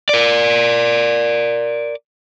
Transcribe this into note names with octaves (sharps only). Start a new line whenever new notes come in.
A#4 D5